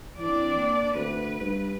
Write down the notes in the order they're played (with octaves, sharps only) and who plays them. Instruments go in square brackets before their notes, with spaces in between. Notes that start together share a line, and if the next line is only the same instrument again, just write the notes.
[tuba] E3 [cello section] C4 D4 D5
[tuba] A#3
[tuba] D2 [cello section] B4
[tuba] G2